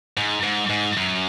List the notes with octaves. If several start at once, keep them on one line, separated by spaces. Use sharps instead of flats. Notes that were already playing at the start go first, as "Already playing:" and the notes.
G#2
G#2
G#2
F#2